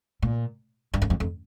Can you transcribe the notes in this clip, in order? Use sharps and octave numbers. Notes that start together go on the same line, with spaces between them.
A#2
G2
F#2
F2
F2